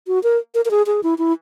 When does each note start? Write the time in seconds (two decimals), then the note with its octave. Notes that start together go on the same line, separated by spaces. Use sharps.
0.07 F#4
0.23 A#4
0.55 A#4
0.65 A#4
0.71 G#4
0.87 G#4
1.03 E4
1.18 E4